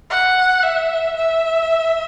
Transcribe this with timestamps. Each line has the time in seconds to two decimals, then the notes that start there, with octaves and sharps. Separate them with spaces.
0.10 F#5
0.63 E5
1.17 E5